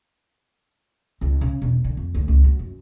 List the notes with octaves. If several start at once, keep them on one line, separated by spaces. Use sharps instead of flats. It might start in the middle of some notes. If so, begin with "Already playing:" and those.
C#2
C#3
E1
D3
F2
D2
C#2
F#3
F#2